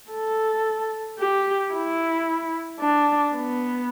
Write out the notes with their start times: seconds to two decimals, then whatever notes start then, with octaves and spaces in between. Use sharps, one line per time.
0.12 A4
1.19 G4
1.73 E4
2.81 D4
3.34 B3